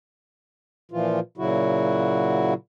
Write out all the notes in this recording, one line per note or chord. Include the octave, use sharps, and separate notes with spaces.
A#2 E3 F3 F4
A#2 C#3 F#3 E4 F#4